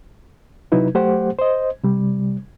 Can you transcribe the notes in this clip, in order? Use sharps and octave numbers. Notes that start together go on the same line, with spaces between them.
C3 F#3 D#4 E4 B4
F#3 A3 G4 C5 F#5
C5 D#5
C3 G3